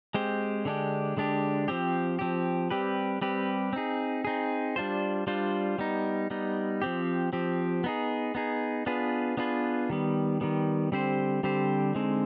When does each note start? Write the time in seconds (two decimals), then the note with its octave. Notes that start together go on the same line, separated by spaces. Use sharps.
0.14 G#3 C4 G4 C5
0.65 D3 G#3 D4 G4
1.17 D3 G#3 D4 G4
1.68 F3 C4 G4
2.19 F3 C4 G4
2.71 G3 C4 G4 B4
3.21 G3 C4 G4 B4
3.73 C4 D#4 G#4
4.25 C4 D#4 G#4
4.76 G3 D4 F4 C5
5.27 G3 D4 F4 C5
5.78 G3 B3 D#4
6.30 G3 B3 D#4
6.82 F3 C4 G4
7.33 F3 C4 G4
7.84 B3 D#4 G#4
8.35 B3 D#4 G#4
8.86 B3 D4 F4 G#4 B4
9.37 B3 D4 F4 G#4 B4
9.90 D#3 G3 B3
10.41 D#3 G3 B3
10.92 D3 G3 C4 G4 C5
11.43 D3 G3 C4 G4 C5
11.95 D3 G#3 C4 D#4